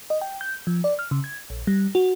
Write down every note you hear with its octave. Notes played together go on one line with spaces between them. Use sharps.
D#5
G5
G6
F3
D5
F6
C#3
G#6
A#1
G3
F#4